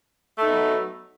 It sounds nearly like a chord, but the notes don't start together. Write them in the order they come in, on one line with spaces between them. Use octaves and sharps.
A3 D#4 B3 F#3